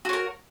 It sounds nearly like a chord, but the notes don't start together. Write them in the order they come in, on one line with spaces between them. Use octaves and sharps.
F#4 C#5 A#4